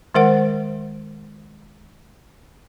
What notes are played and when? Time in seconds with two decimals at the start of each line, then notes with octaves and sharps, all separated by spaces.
0.14 D#3 G#3 A#4 C5 F#5